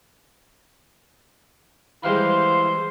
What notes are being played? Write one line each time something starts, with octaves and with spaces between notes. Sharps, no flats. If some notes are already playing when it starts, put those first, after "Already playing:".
E3 G3 G#3 E4 C5 F5